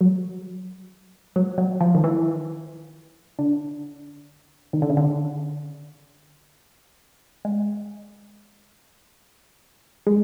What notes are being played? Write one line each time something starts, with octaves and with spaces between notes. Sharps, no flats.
F#3
F#3
F#3
F3
D#3
E3
D3
D#3
D3
C#3
D3
G#3
G#3